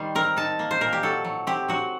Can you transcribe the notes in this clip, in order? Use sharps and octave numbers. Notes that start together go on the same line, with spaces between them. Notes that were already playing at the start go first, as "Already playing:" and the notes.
Already playing: D#3 G3 C5
C4 A#4
D#4 A5
A#3
C5
A#2 A#4
G4
F#3 A4
F#3
C4 G4
F#3 F#4